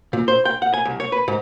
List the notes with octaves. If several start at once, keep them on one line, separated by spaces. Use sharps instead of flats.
A#2
C5
G5
F#5
G#5
C2
C#5
B4
G#2